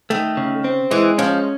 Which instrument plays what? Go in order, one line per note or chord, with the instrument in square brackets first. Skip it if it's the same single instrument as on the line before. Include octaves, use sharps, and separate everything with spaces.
[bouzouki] D#3 [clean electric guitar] A3
[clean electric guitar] C#3
C4
[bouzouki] E3 [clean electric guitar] G#3
[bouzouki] F3 [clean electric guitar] C#4